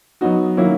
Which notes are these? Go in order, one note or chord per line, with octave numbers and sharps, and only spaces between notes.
F#3 B3 D#4 F#4
D#3 F#3 A#3 C#4 E4